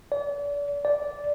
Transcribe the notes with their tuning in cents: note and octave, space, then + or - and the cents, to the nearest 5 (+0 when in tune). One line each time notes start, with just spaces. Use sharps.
D5 -35
D5 -10